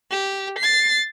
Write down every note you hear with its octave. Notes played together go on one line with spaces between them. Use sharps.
G4
A6 C7